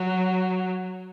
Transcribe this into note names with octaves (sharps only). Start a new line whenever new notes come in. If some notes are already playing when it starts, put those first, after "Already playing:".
Already playing: F#3